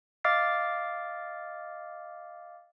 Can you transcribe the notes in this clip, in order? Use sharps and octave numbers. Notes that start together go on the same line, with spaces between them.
D#5 F5 D6 F6 A6 C7